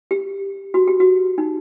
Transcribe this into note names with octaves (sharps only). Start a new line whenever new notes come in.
G4
F#4
G4
F#4
D#4